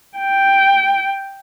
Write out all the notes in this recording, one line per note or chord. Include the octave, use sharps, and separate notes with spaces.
G5